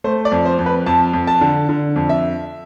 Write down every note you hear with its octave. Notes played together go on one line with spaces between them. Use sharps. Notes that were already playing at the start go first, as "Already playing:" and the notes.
A3 C5
D5
F2
C5
F2
B4
F2 A5
F2
A5
D3
D3
F2
E5